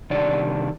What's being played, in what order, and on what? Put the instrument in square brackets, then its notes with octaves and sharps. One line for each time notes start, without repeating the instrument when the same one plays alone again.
[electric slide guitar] C3 D#3 G3 D4 D5